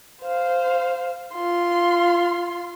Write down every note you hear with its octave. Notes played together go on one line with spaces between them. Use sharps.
C5 F5
F4 C6